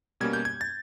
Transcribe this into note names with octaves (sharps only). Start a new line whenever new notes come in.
B2 G3 A#3 C#4 G#6
G6
G#6
A6